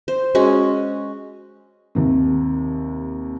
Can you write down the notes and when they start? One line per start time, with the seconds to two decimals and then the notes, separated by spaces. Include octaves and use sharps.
0.08 C5
0.35 G#3 C#4 F#4
1.95 D#2 C3